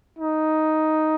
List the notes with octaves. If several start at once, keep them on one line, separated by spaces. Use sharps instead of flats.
D#4